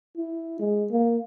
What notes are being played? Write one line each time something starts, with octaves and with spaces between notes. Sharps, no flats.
E4
G#3
A#3